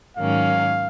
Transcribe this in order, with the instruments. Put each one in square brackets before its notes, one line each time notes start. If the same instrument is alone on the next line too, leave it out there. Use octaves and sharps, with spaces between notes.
[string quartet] G#2 D#3 F#3 A#3 C#4 [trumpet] F5